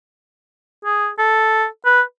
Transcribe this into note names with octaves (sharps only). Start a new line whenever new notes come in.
G#4
A4
B4